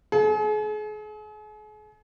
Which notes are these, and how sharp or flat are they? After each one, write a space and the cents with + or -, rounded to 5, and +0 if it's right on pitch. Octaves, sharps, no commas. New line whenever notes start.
G#4 +40